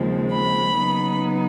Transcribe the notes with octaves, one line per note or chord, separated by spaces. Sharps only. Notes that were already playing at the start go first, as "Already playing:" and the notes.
Already playing: D#2 C#3 F3 G#3 C4
B5
C#3 F#3 B3 D#4